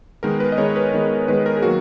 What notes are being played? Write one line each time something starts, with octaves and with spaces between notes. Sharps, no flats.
D#3 G#3 B3 A#4
B4
D#5
D#3 G#3 B3 C#5
B4
D#3 G#3 B3
D#3 G#3 B3 B4
A#4
G#4
D#3 F#3 A#3 F#4